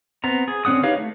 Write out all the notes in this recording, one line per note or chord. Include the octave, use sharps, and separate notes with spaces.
B3 C4 A#5
G#4
D3 C4 C#4 F#5 D#6
D#4 G4 B4 C#5 F5
A3